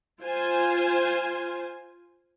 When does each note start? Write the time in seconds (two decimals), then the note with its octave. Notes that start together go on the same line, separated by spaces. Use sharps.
0.21 F4 C5 G#5